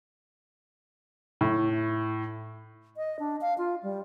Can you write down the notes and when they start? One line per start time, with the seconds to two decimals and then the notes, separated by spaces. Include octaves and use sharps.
1.41 A2
2.97 D#5
3.19 D4
3.41 F5
3.58 F4
3.83 G3